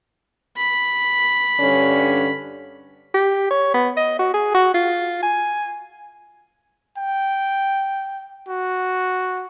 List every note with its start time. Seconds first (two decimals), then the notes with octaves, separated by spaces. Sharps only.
0.57 B5
1.60 G2 D3 C#4
3.15 G4
3.51 C#5
3.74 B3
3.97 D#5
4.19 F#4
4.34 G#4
4.55 F#4
4.74 F4
5.23 G#5
6.98 G5
8.48 F#4